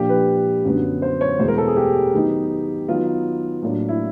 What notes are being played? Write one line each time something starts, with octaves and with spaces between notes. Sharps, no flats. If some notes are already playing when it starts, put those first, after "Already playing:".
Already playing: A#2 F3 A#3 D4 G4
B4
F#2 D3 F#3 B3
C5
C#5
E2 B2 G#3 B3 C5
A#4
A4
G#4
G4
D#3 F#3 B3 D#4
D#3 F#3 B3 D#4 F4
A2 F#3 A#3 D4
E4